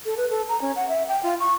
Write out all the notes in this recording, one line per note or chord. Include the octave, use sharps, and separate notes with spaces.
A4
B4
A4
A#5
C#4
F#5
E5
G5
F4
C#6